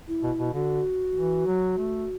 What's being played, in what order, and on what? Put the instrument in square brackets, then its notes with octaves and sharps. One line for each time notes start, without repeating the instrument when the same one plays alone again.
[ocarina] E4
[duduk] B2
B2
[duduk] D3 [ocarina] F#4
[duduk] E3
F#3
A3